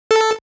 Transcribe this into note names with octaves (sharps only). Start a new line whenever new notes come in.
A4